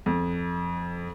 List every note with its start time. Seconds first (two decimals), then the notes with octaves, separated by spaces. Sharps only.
0.06 F2